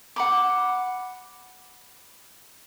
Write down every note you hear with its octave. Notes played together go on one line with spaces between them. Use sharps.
F#5 B5 D6